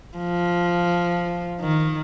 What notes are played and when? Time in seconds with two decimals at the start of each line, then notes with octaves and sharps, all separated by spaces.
0.17 F3
1.61 D#3